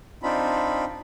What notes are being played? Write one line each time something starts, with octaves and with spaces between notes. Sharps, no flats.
C4 D4 D#4 F4 B5